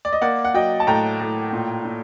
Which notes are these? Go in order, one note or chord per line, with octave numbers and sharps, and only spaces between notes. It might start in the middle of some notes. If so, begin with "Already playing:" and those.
D5
D#5
A#3 D5 F#5
F#5
F#3 D#5 G5
A5
A2 G5 A#5
A2
A#2
A#2